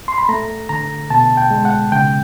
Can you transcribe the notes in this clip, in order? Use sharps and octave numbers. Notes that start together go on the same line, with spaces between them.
C6
B5
A3 A#5
D3 A#5
B2 A5
G5
G#3
F#5
C#3 G5